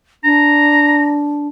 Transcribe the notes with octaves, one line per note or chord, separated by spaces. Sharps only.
D4 A#5